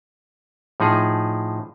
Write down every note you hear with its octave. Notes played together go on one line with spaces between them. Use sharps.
A2 F3 D#4 G#4